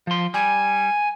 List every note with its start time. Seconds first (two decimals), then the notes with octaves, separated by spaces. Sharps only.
0.07 F3 C6
0.34 G3 G#5